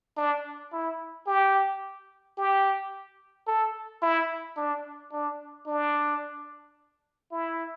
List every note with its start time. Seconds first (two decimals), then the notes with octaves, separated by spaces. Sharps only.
0.17 D4
0.73 E4
1.27 G4
2.38 G4
3.47 A4
4.02 E4
4.57 D4
5.12 D4
5.67 D4
7.32 E4